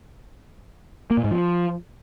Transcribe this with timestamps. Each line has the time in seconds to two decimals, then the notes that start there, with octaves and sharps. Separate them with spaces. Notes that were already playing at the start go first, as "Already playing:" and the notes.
1.11 A#3
1.17 A#2
1.24 G#2
1.31 F3